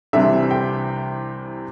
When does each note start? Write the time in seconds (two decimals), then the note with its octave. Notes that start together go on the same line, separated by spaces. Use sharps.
0.13 C2 C3 E3 G3 D4 E5
0.51 G5